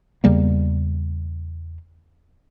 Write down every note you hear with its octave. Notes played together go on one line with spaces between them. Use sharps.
E2 C#3 G3 A#3